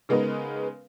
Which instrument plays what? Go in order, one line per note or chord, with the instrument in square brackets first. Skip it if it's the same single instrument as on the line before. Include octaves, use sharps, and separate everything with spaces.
[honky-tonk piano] C#3 G#3 B3 D#4 A#4 B4